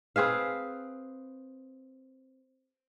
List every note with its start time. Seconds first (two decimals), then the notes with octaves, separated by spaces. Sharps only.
0.16 C4 G#4 B4 F5